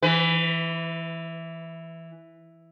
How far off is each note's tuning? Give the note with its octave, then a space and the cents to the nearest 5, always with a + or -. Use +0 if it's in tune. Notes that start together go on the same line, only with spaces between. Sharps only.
E3 +0 B4 +30